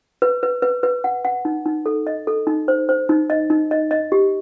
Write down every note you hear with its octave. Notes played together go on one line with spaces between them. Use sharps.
B4
B4
B4
B4
F#5
F#5
D#4
D#4
A4
D#5
A4
D#4
C5
C5
D#4
D#5
D#4
D#5
D#5
G4